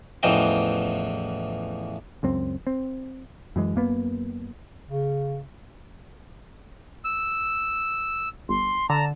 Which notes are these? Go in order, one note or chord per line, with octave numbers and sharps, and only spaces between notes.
A1 E2 E3 F3 D#5 G5
C#2 F#2 C4
C4
F#2 E3 G#3
F#2 A#3 B3
C#3
E6
G1 C6
D3 A5 A#5